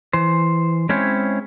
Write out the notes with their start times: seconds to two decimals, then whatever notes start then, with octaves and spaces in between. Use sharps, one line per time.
0.13 E3 C5
0.89 G#3 C4 C#4 E4 C5 C#5